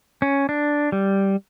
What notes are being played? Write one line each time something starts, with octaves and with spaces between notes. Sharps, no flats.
C#4
D4
G3